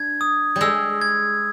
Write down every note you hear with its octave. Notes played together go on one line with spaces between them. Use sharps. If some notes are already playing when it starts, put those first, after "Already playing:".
Already playing: D4 G#6
D#6
G3
G#3 E6
G#6